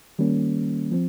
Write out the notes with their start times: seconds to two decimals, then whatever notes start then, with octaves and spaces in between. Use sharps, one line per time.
0.19 D#3 G3 A#3 C#4
0.92 F3 C4